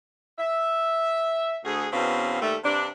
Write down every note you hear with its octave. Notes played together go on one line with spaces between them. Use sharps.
E5
D2 G#4
E2 B2 C4 C#4 F5
D#2 G3 A3
G2 C3 D4